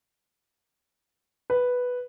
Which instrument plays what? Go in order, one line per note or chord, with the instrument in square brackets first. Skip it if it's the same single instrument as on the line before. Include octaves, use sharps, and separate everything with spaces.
[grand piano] B4